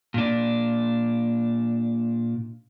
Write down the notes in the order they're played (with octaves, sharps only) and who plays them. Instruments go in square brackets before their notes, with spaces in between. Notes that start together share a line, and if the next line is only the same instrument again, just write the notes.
[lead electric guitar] A#2 D4